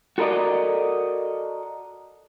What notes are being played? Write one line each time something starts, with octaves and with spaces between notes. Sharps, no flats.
F#4 A4 A#4 D5 D#5